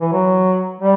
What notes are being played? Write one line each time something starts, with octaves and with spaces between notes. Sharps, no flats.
E3
F#3
G3